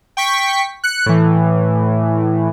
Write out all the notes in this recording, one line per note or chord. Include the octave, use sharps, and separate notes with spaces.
G5 C#6 B6
F#6 C#7
A2 E3